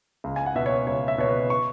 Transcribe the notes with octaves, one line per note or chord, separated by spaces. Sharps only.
C#2
G#5
F#5
B2 E5
C#5
C#2 C#5
E5
B2 C#5
B4
C#6